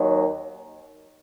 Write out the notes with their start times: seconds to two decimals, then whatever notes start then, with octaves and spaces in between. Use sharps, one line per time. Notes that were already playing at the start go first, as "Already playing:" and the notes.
Already playing: D#2 D#3 F#3